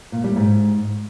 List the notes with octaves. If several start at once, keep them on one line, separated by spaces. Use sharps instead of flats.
A#2
G3
G#2